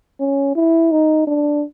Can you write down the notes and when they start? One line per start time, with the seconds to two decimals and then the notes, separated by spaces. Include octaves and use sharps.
0.20 C#4
0.55 E4
0.91 D#4
1.27 D4